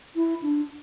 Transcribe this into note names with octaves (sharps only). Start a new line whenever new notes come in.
E4
D4